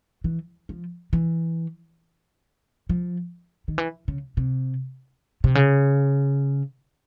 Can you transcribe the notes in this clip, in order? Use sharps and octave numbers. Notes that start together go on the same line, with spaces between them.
E3
F3
E3
F3
D#3
E3
C#3
C3
C3
C#3